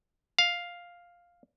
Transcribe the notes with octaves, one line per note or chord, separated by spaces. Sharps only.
F5